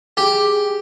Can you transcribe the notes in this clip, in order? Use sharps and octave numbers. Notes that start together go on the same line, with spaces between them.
G4 G#4